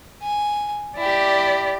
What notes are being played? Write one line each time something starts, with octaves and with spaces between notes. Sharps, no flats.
G#5
E4 G4 D5